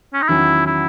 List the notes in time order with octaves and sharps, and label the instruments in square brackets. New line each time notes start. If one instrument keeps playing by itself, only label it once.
[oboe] C#4
D#4
[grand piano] E2 D#3 F#3 C#4 [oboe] E4
[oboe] E4